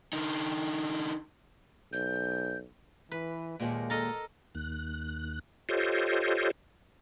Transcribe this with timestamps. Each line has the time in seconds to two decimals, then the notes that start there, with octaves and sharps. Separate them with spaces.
0.13 D3 D#4
1.92 B1 G6
3.11 E3 B4
3.60 D#2 A#2 G#3
3.90 A4 A#4 D#5
4.55 D#2 F#6
5.69 F4 G4 A4 C5 C#5 D#5